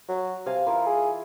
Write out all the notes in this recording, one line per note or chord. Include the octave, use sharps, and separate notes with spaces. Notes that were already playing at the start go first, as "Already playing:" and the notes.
F#3
C3 F5 G#5 A5
E3 F4 A#4
G#4